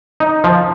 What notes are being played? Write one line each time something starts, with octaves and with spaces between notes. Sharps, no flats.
D#4
F3